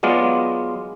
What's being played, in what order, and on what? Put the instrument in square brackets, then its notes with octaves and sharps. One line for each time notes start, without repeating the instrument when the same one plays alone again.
[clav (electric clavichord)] F#3 G#3 B3 F4 D5